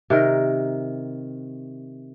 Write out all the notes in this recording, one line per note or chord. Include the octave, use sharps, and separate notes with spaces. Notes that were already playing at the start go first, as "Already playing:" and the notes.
C3 D#3 A#4